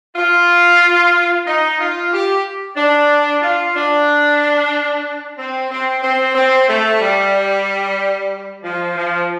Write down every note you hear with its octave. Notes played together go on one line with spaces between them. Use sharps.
F4
D#4
F4
G4
D4
F4
D4
C4
C4
C4
C4
A3
G3
F3
F3